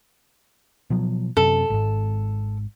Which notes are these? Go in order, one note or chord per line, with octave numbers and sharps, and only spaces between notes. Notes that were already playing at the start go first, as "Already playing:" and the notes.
B2 F3 F#3
F#2 C3 A4
G#1 G#2